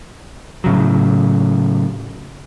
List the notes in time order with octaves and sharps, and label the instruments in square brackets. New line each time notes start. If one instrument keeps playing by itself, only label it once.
[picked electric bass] A2 C#3 F#3